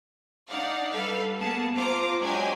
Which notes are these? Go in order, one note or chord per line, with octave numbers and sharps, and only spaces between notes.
D4 D#4 D5 F5 F#5
G3 A4 B4 F5
A#3 B3 G#4 A5
F4 C5 F5 A#5 D6
F#3 G#3 D4 G4 G#5